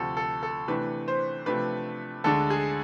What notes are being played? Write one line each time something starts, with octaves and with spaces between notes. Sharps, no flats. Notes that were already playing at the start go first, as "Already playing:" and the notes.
Already playing: D2 C3 F3 A4
A4
A4
C3 E3 A3 D4 B4
C5
C3 F3 A3 D4 B4
D2 D3 G#3 D4 A4
G#4